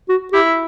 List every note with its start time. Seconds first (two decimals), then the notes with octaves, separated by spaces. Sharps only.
0.09 F#4
0.33 E4 G4